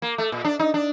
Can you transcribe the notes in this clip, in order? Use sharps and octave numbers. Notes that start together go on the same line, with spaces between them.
A#3
A3
A#2
D4
D#4
D4